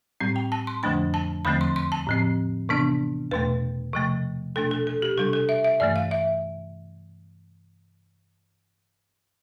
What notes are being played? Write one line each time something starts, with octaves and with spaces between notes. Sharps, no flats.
A2 G3 C4
G5
A5
C6
F2 D3 F3 A3 D4 B5
A5
E2 D3 F3 A3 C4 B5
C6
C6
A5
A2 F3 C4
C3 E3 B3 D4
E2 B2 A3 B4
C3 F3 A3
B2 A3 D4 A4
A4
A4
G4
C3 G3 D4 A4
A4
E5
E5
G2 E3 A3 D5
F5
E5